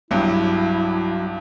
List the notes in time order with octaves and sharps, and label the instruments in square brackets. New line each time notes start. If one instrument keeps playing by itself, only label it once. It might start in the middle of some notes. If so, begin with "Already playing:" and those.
[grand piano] B1 G2 [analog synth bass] F#3 [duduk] E4